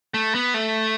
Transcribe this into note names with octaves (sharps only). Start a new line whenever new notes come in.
A3
B3
A3